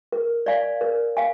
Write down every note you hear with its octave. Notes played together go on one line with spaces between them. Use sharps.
A#4
D5 F5 G#5
A#4
F5 G#5